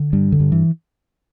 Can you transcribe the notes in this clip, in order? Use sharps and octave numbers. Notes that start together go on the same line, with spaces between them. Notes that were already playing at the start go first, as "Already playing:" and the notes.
Already playing: D3
G2 G3
D3
G2
E3